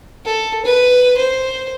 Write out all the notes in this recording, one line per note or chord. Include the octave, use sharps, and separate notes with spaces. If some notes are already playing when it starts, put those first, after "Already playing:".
A4
B4
C5